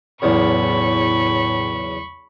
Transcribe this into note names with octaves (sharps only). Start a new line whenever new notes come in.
B1 E2 A2 C#3 B5 C#6